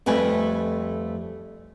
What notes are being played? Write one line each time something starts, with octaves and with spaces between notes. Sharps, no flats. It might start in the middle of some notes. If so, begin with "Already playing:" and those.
F2 G3 A3 B4 G#5